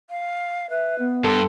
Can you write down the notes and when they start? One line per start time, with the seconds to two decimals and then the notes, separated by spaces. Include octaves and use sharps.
0.10 F5
0.70 B4 E5
0.99 B3
1.24 G2 A4 C6